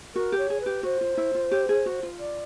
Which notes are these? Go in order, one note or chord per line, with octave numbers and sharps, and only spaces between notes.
F#4 A#4
G4
C#5
G#4
B4
G4
F#4 C5
F4
E4
F4
G4
G#4
F#4
F4
D5